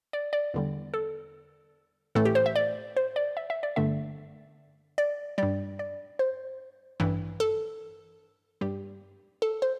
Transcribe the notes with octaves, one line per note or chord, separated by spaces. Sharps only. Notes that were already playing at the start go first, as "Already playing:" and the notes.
D5
D5
E2 D3 G3
A4
A1 A2 E3 A3 A4
G4
C5
E5
D5
C5
D5
E5
E5
D5
G1 G2 D3 A3 E5
D5
G2 G3 D5
D5
C5
A1 G2 E3
A4
G2 G3 G4
A4
C5